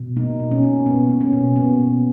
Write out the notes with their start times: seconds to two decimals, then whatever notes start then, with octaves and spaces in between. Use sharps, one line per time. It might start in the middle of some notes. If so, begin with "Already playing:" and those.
Already playing: B2
0.17 A#3 D#4
0.40 B2
0.51 C#4
0.64 A#3
0.86 B2 B3
1.09 A#3
1.21 C#4
1.33 B2
1.56 A#3 B3
1.79 B2